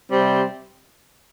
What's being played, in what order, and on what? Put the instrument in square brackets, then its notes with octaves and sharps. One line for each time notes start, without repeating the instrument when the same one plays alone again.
[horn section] C3 G3 C4